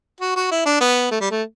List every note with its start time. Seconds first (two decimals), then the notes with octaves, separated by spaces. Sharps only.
0.21 F#4
0.36 F#4
0.51 E4
0.66 D4
0.81 B3
1.11 A3
1.21 G3
1.31 A3